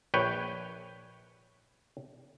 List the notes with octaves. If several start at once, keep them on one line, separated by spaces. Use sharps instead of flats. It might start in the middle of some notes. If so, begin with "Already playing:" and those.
A#1 B4 C#5 G5